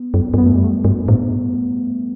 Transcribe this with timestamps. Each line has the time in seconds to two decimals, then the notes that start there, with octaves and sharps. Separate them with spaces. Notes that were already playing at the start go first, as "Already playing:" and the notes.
Already playing: B3
0.14 F#2
0.34 G2
0.38 F#2 B3
0.46 A3
0.55 G3
0.64 A3
0.84 G2
1.08 A2